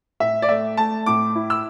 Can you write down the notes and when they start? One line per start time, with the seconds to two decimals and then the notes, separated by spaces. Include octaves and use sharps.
0.20 A2 E5
0.42 D5
0.49 A3 E5
0.77 A3 A5
1.06 A2 D6
1.35 E4
1.50 E6